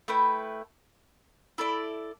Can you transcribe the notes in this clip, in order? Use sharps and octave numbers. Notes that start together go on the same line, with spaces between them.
A3 E4 B4 G5
E4 A4 D5